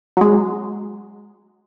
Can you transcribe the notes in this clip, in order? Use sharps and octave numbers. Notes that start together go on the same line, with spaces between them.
F#3 G#3